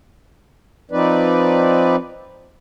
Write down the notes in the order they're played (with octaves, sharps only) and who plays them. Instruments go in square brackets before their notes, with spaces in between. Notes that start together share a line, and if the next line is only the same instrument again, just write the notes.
[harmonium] F3 C4 D#4 B4 D5